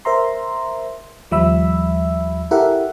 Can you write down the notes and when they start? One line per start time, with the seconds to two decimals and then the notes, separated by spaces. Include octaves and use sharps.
0.05 A#4 C5 E5 A#5 C6
1.31 D#2 F3 G3 E5 B5 E6
2.51 E4 G4 A4 A#4 E5 F#5